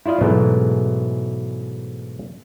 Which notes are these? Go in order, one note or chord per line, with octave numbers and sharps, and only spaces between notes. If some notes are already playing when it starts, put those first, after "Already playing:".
E4 F4 D5 D#5 F5
G#2 B2 E3 F#3 G#3 A3